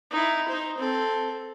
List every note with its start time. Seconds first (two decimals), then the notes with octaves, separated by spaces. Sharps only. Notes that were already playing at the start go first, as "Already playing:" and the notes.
0.11 D#4 E4
0.48 D#4 C5
0.78 C4 A4